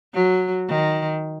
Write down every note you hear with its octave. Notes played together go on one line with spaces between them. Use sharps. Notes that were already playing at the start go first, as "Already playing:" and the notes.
F#3
D#3